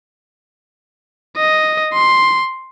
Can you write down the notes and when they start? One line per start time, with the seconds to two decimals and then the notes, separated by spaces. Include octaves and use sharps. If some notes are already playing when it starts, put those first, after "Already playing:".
1.37 D#5
1.93 C6